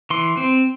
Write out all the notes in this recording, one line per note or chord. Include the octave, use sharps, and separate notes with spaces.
E3 C6
C4